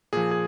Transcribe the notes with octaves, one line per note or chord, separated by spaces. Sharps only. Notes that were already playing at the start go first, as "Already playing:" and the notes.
A#2 F3 G#4
G#4